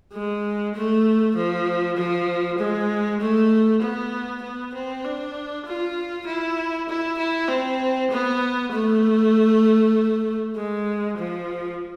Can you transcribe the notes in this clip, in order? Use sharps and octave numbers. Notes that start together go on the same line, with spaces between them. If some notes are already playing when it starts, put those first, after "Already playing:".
G#3
A3
F3
F3
G#3
A3
B3
B3
C4
D4
F4
E4
E4
E4
C4
B3
A3
G#3
F3